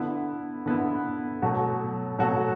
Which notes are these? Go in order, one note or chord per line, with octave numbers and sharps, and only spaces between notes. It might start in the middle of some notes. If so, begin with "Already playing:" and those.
Already playing: D3 B3 E4
D3 B3 E4
B2 F#3 A3 F#4 A4
B2 F#3 A3 F#4 A4